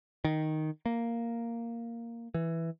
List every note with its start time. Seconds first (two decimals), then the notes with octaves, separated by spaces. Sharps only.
0.24 D#3
0.86 A#3
2.34 E3